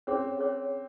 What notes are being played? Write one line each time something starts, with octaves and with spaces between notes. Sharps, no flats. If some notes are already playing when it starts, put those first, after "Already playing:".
C4 C#4 G#4 C#5
C#4 G#4 C#5